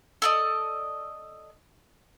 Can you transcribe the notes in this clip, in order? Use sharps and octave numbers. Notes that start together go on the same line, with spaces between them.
A4 D5 D#5